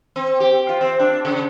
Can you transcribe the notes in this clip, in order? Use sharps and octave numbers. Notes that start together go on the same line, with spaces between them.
C4
G4
F4
C4
D4
C#3